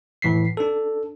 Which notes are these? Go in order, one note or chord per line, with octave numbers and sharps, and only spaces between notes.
A2 E3 B6 C7
D4 A4